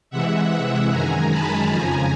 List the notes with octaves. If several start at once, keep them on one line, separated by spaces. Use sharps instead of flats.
C3 E3 G#3 E5 F#5
F#2 D#3 G#3 G#5 A#5
A5 B5
F2 C#3 F3 G#5 A#5